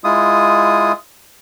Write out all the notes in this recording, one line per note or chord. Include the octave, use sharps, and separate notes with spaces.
G#3 E4 F4 D#6